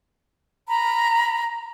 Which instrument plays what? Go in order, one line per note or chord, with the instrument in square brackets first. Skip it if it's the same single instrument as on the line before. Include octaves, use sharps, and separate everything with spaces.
[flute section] A#5 B5